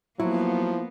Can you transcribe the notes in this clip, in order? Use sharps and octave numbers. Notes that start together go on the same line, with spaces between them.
F3 F#3 A#3 B3 E4